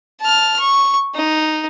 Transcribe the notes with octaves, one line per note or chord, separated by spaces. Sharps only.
A5 F6
C#6
D#4